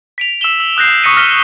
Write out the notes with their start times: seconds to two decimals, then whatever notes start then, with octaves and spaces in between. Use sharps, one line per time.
0.18 B6 D7 F7
0.41 E6 E7 G7
0.60 E6
0.77 D#6 F#6 G6 A#6 C7
1.03 C#6 D#6 A#6 B6 C#7 D#7
1.17 F6 A#6 B6 D#7 G7